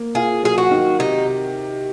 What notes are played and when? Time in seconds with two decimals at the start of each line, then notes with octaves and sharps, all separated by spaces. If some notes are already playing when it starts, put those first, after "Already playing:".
Already playing: A#3
0.15 F4 G#4
0.43 F#3 G#4
0.58 F#4
0.71 D#3
0.99 C3 D#4